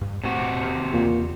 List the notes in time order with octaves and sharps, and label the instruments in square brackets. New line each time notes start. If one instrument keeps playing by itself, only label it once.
[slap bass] G2
[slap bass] E1 A2 A3 [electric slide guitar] C3 F#4
[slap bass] D#2
[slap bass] E2 C#3 [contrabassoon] A#2